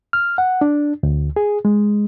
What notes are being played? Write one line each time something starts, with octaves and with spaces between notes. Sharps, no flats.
F6
F#5
D4
D2
G#4
G#3